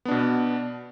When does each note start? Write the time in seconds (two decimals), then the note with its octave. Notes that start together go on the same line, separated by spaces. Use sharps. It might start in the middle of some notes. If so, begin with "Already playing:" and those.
0.05 B3
0.08 D4
0.11 B2